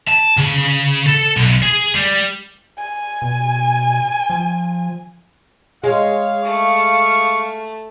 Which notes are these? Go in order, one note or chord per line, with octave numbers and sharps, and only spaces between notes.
A5
C#3
A4
B1
G#4
G3
G#5
B2
F3
G#3 G#4 C#5 F5
A3 C#6